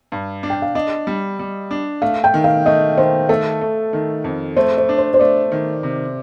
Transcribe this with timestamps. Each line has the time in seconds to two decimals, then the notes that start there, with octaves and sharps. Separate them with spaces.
0.12 G2
0.43 D4
0.50 G5
0.62 F5
0.75 D4 D#5
1.07 G3
1.39 G3
1.71 D4
2.02 A3 F5
2.24 G5
2.34 D#3
2.44 F5
2.66 A3 D#5
2.97 D#3 C5
3.29 A3 A4
3.61 A3
3.93 D#3
4.24 F2
4.56 A3 C5
4.78 C5
4.89 D4
4.98 C5
5.14 C5
5.19 A3 D5
5.52 D#3
5.83 C3